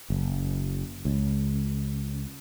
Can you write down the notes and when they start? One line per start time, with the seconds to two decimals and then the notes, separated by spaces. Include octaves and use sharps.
0.10 F#1
1.05 C#2